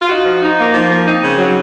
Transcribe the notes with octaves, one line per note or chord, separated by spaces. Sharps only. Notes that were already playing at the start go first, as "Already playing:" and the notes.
F4
D#4 F#4
F3
D#4
A#3
F3
A#3
C4 D#4
C#3
F#3